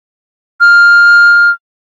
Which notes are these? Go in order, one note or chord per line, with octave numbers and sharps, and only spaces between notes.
F6